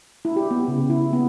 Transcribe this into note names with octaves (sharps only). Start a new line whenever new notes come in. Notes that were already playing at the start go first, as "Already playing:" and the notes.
E4
G4
B3
C#3
E4
B3